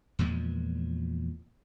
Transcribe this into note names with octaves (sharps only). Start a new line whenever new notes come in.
E2 A#2 F3 G#3